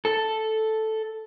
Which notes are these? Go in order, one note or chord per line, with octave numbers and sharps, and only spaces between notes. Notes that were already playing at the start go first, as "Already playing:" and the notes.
A4